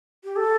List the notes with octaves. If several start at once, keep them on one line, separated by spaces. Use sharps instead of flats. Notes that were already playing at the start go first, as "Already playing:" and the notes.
G4
A4